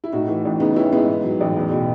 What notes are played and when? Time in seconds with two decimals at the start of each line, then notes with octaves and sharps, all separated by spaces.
0.04 E4
0.12 A2 D#4 F#4
0.28 E3
0.45 A1
0.60 C#3 B3 D#4
0.76 E3 C#4 E4
0.92 G#3 B3 D#4
1.08 G#2
1.24 F#3
1.40 A1
1.56 E2
1.71 B2